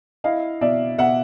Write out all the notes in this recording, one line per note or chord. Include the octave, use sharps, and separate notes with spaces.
E4 D#5 F5
B2 D5 E5
B2 E5 F#5